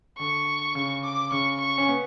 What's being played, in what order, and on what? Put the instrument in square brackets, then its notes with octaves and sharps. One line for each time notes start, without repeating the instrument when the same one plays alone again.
[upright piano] D3 [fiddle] C#6
[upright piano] C#3
[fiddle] D6
[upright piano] C#3 [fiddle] C#6
[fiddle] C#6
[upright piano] C#4
B3